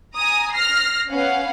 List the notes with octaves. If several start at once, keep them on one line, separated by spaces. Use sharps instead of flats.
G#5 A#5 D#6
F6 A#6 C7
B3 C#4 B4 F5 F#5